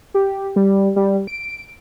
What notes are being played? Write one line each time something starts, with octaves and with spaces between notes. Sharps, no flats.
G4
G3
G3
D7